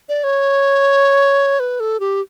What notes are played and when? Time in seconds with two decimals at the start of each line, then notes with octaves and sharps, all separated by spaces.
0.09 D5
0.24 C#5
1.60 B4
1.80 A4
2.00 G4